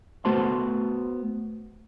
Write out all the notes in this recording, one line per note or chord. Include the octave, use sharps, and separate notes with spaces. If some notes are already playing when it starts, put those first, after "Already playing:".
A3 B3 F#4 C5 A5 C6